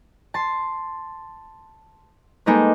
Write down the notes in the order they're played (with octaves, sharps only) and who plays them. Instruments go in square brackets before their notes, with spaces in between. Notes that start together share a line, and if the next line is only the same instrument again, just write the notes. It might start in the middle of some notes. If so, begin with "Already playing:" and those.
[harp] A5 C6
G3 G#3 A#3 D#4 A4 B4